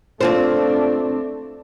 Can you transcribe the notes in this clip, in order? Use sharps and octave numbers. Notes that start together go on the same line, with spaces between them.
A3 C4 D4 F4 C5